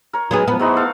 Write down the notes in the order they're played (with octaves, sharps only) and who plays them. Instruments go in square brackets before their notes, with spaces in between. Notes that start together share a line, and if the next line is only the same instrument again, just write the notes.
[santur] A#4 C#5
[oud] F#3 B3 G#4 [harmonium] G#3 D#4
[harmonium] F#2 F3 B4 [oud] B3
[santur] F#3 D#4 F#4 [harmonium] E4 G#4 C5
[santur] A4 F5